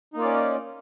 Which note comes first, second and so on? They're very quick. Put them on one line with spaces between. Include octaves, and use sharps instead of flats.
D#4 A#3 F4 D5 C#4